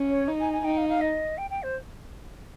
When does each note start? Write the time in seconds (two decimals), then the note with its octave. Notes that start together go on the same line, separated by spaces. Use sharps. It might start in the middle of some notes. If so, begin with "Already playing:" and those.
Already playing: C#4
0.10 C#5
0.28 D#4
0.40 G#5
0.53 G#5
0.64 D#4 G5
0.77 F5
0.89 F5
1.01 D#5
1.37 G5
1.50 G5
1.63 C5